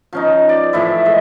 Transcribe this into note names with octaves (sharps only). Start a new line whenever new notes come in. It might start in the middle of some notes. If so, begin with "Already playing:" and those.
F3 C#4 D#4
D5
A2 E3 F3 E4
G#3